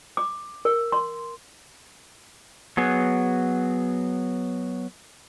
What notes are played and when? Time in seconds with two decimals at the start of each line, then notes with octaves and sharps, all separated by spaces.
0.17 D6
0.65 A#4
0.92 C6
2.77 F#3 B3 G#4